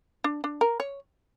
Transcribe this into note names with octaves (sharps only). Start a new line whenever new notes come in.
D4
D4
A#4
C#5